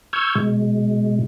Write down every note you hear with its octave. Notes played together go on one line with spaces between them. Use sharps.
C#6 E6 F6 G6 G#6
B2 G#3